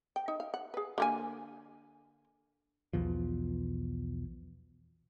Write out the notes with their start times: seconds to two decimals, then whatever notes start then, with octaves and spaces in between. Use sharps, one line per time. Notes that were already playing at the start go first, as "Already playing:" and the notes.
0.16 G5
0.28 D#4
0.40 F5
0.54 F#5
0.74 G#4 B4
0.98 D3 A#3 G#5
2.93 B1 E2 B2 F3